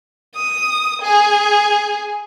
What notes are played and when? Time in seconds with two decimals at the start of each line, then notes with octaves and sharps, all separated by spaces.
0.35 D#6
1.02 G#4